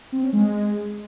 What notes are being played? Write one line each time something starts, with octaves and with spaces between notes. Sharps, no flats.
C4
C#4
G#3